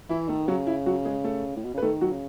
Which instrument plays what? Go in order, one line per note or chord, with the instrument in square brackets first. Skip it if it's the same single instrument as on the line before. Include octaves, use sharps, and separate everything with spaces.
[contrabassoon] E3 [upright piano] E4
[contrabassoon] D#3 [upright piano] A3 A4
[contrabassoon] C#3 [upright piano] F#3 F#4
[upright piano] E4
F#3 F#4
G#3 G#4
A3 A4
[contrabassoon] A2
B2
C#3
[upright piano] B4
[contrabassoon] D#3 [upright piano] A3 A4
[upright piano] F#3 F#4
[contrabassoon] C#3